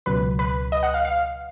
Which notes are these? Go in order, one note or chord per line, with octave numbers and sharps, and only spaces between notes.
C#2 B2 F#3 B4
B4
D#5
F#5
F5
F5